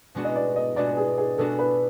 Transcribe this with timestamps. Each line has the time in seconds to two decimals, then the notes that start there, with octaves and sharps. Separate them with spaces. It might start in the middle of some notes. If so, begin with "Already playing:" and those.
0.15 B2 G#3 B3 D4 F#4
0.24 D#5
0.35 D5
0.56 D#5
0.76 B2 G#3 B3 D4 F#4 D5
0.97 G#4
1.18 G#4
1.38 B2 G#3 B3 D4 F#4 A4
1.59 B4